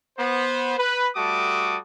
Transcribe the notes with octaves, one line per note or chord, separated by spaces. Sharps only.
B3 C5
B4
G3 A3 F#4 A4 D6 D#6